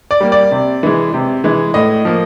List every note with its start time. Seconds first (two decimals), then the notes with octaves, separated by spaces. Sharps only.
0.11 D5
0.20 G3 A#3
0.32 D5
0.51 C3
0.83 E3 G#3
1.14 C3
1.44 E3 G#3
1.74 A2 D#5
2.05 F3 A#3